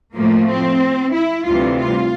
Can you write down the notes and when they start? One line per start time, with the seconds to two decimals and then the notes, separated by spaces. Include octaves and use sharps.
0.15 A2 F3 A3 A#3
0.48 C4
1.13 E4
1.45 D2 C3 E3 G3 F4
1.78 F4